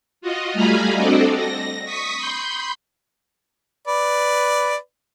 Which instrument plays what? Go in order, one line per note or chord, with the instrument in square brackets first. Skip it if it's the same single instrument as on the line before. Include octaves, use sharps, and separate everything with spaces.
[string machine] F4 F#4 D#5
G3 A3 F5 G#5 A#5 B5
C4 D4 F#4 A4 D5 D#5
A#6
C#6 D#6 B6
B5 C6 G6
[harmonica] B4 D5